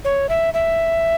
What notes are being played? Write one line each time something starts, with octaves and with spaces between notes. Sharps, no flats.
C#5
E5
E5